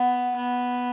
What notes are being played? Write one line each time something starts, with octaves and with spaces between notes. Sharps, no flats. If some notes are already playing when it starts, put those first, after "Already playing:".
Already playing: B3 F#5
B3